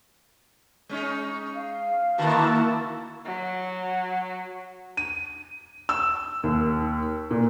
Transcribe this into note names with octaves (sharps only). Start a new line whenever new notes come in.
G#3 C#4 D#4
F5
D3 D#3 A#3 E4 F#4 A5
F#3
D#7
E6
D#2
A#2